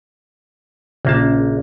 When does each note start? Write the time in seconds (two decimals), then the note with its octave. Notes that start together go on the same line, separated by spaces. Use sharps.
1.05 A#1 C#3 A#3 A5